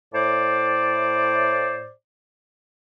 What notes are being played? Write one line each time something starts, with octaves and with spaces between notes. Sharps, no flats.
A2 C5 D5